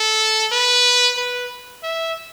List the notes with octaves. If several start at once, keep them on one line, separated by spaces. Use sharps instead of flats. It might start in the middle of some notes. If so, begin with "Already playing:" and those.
Already playing: A4
B4
B4
E5